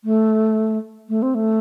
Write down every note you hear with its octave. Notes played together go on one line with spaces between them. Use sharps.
A3
A3
C4
A3